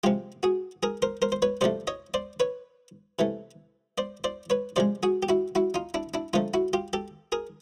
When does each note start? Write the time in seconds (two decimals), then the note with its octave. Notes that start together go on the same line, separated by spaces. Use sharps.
0.04 C3 F3 G#3 F4 G4
0.43 F#4 G#4
0.83 G#4 A#4
1.02 A#4 C5
1.22 A#4 C5
1.32 C5
1.42 B4 C#5
1.61 C3 F3 A3 C5 D5
1.87 C#5 D#5
2.14 C5 D5
2.40 B4 C#5
3.19 C3 E3 A3
3.98 C5 D5
4.24 C5 D5
4.50 B4 C#5
4.76 C3 F3 G#3 C5 D5
5.03 F#4 G#4
5.23 G4
5.29 E4 F#4
5.55 E4 F#4
5.74 D#4 F4
5.94 D4 E4
6.14 D4 E4
6.33 D3 F3 A3 D#4 F4
6.54 E4 F#4
6.73 F4 G4
6.93 G4 A4
7.32 G#4 A#4